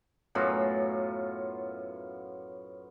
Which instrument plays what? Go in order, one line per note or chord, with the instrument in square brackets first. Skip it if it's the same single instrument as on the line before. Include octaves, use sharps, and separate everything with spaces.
[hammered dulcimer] F#2 A2 B3 F4